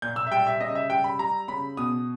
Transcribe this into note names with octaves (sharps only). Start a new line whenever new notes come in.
A#2 G6
E6
E5
G3 G5
E5
C#3 D#5
E5
G3 G5
B5
G3 A#5
C#3 B5
B2 D#6